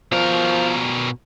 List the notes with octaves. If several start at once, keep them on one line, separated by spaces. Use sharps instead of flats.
B2 F3 A#4